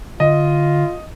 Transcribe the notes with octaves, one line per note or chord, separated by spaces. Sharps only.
D3 F4 D#5